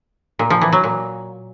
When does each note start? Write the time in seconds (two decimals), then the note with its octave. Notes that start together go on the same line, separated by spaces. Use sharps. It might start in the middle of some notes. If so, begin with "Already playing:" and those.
0.39 A#2
0.50 F3
0.61 E3
0.72 F#3
0.84 A#2